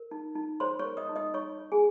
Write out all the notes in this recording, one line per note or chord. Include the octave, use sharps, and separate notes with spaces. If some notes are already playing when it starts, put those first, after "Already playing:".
Already playing: A#4
D#4
D#4
C5 C#5 C6
C#5 C#6
A#4
D#5 D#6
D#4
D#5 D#6
D#4 C#5 C#6
C#5
G#4 G#5